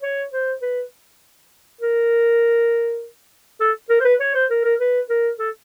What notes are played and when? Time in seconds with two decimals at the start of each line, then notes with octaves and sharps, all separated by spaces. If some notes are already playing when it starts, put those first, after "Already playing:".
0.02 C#5
0.32 C5
0.62 B4
1.81 A#4
3.60 A4
3.89 A#4
4.00 C5
4.05 B4
4.20 C#5
4.35 C5
4.50 A#4
4.64 A#4
4.80 B4
5.09 A#4
5.39 A4